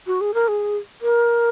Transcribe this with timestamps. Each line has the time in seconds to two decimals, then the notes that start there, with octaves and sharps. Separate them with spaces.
0.07 F#4
0.21 G#4
0.34 A#4
0.48 G#4
1.02 A#4